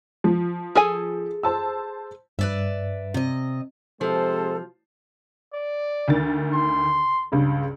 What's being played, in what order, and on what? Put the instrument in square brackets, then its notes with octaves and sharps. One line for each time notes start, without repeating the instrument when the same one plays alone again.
[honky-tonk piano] F3
[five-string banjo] G#4 A4 G#5
[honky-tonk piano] C5 A5 E6
[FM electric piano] G2 [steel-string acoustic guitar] B4 D5 E5
[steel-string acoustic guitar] C3 D#5
[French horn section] C3 G#3 [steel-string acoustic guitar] F3 [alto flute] A4 [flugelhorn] C5
[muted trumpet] D5
[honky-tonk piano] D2 D#3 A6
[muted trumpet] C6
[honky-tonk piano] C#2 G2 C#3